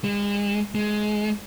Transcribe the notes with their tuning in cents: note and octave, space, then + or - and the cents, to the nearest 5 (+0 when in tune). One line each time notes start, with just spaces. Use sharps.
G#3 -35
G#3 +15